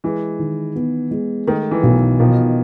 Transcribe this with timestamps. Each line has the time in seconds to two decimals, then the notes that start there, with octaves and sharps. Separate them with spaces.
0.04 E3 G#3
0.39 D#3
0.75 B3
1.11 G#3
1.47 D#3 A3
1.71 E3
1.83 B1
2.19 B2 D#3 F3